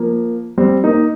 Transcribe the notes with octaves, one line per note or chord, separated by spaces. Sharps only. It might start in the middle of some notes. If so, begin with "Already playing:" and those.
Already playing: F3 A#3
G3 C4
A#3 D#4